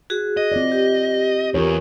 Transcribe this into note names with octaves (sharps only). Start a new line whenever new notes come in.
F#4 G#4
D#5
C4 F4 D5
G4
E2 F4 A#4 C#5